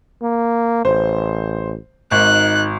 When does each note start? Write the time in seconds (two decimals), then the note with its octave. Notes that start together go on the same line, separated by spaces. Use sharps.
0.22 A#3
0.85 A1 C5
2.11 G#1 D#4 F#6